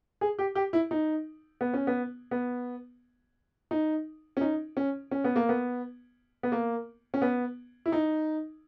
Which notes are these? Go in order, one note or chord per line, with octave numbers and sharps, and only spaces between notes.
G#4
G4
G4
E4
D#4
B3
C#4
B3
B3
D#4
C#4
D#4
C#4
C#4
B3
A#3
B3
B3
A#3
C#4
B3
E4
D#4